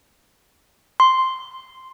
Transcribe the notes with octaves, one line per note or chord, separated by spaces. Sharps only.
C6